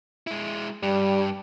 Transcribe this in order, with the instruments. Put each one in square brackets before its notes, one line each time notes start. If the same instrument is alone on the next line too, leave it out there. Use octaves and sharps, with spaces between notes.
[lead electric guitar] G#3 E4
[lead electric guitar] G2 [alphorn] G3